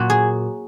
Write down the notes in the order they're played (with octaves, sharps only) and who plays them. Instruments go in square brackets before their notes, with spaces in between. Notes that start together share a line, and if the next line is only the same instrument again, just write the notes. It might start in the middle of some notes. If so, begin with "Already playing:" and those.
Already playing: [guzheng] A#2 F#3 F#4
G#4